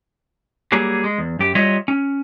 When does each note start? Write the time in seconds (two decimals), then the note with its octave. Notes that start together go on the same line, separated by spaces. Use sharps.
0.72 F#3 G3 A#3 G#4
1.04 G#3
1.18 E2
1.39 F#2 G4
1.55 F#3 G3 F4 C#5 D#5 E5
1.88 C#4